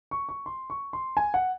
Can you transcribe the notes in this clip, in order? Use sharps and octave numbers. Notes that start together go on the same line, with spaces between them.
C#6
C#6
C6
C#6
C6
G#5
F#5